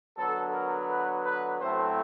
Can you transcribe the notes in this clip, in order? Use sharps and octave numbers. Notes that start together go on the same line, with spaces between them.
D3 F#3 B3 A4
A#4
B4
B4
A2 F#3 A3 C4 C5